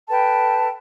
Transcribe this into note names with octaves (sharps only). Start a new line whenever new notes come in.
A4 B4 G5 A5